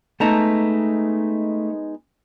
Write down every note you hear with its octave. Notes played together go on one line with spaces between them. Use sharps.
G#3 A3 B3 D#4 A5 A#5